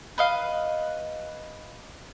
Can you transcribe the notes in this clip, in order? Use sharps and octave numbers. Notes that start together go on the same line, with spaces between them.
B4 D#5 F5